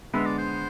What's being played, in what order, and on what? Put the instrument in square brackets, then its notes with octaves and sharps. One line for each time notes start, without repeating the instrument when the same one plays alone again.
[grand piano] D3 G#3 B3 [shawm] E5
[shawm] D5
C5